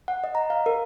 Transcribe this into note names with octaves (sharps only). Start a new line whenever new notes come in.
F#5
D#5
A#5
F5
A#4